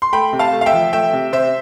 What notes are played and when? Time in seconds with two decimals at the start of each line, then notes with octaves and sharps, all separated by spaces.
0.02 C6
0.13 A3 G5 B5
0.33 C3
0.39 F5 A5
0.52 A3
0.61 F5
0.66 E5 G5
0.73 F3
0.93 A3 E5 G5
1.13 C3
1.32 C3 C5 E5